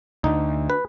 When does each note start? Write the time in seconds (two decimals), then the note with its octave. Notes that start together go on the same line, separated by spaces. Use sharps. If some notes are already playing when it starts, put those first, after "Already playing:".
0.24 D2 D3 D#4
0.70 B4